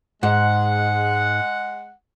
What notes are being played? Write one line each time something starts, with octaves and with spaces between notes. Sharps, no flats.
G#2 G#3 F#5